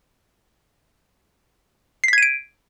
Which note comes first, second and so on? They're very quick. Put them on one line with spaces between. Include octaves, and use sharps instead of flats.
C7 B6 G#6 D#7 D7